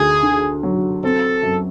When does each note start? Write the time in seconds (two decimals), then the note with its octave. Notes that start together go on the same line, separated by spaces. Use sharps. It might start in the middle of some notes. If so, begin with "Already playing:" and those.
Already playing: D2 G#4
0.23 D3
0.63 F#3
1.03 C4 A4
1.43 F#2